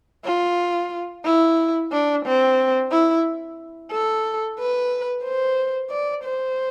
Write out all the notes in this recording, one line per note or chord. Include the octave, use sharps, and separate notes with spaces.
F4
E4
D4
C4
E4
A4
B4
C5
D5
C5